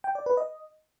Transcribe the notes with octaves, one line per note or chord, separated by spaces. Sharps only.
G5
D5
B4
D#5